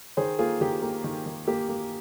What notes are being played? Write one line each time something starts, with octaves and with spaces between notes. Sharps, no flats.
D#3 G#4 C5
A#3 F4 G#4
D#3 G4
A#3
D#3
D#3
A#3 G4
A#3